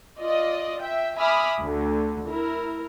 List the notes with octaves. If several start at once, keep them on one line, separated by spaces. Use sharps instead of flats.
F4 D5 D#5
E5 G5
E5 G#5 B5 D6 D#6 F6
D2 D3
E4 A#4